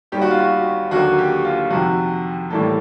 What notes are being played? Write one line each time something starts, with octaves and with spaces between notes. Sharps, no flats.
D#2 D#3 G3 G4
F#4
F4
F#4
D#2 D3 F#3 A#3 F#4
G4
F4
F2 C3 D#3 F#4
A2 E3 G3 A#3 A4